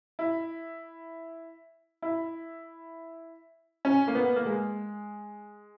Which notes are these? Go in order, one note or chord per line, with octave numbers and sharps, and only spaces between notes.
E4
E4
C#4
A#3
B3
A#3
G#3